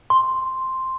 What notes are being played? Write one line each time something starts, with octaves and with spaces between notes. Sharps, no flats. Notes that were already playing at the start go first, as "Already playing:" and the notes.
C6